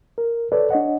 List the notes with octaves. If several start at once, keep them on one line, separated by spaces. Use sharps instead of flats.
A#4
A4 B4 C#5 D5
D4 C#5 D#5 F#5